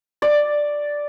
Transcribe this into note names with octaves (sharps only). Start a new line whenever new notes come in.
D5